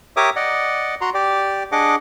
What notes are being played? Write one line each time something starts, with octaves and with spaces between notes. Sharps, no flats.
G4 A#4 C#5 E5 D6 D#6
D5 D#5 F#5
F#4 A#5 C6
G4 D5
D4 G#4 D#5 F#5 D6